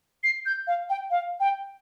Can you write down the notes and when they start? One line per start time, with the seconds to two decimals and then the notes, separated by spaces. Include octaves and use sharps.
0.24 C7
0.46 G6
0.67 F5
0.90 G5
1.10 F5
1.40 G5